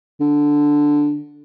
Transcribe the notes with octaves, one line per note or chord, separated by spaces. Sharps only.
D3